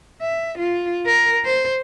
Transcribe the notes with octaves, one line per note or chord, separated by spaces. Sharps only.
E5
F4
A#4
C5